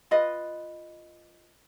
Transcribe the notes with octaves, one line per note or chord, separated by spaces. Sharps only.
F4 B4 D#5